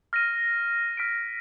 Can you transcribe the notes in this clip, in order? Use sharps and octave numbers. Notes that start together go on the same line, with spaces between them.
F6 A#6 D#7
F6 B6 D7